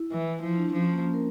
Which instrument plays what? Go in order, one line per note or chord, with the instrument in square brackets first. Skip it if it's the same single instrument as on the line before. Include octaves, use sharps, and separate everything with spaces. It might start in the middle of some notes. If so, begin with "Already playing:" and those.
Already playing: [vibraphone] E4
[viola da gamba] E3
[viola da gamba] F3 [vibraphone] E4
[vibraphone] D4
[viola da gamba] F3 [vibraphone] C#4
[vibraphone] C#4
A#3
C#4
A#4